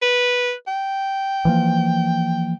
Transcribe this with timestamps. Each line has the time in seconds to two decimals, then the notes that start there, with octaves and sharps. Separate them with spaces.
0.02 B4
0.68 G5
1.45 E3 F3 A#3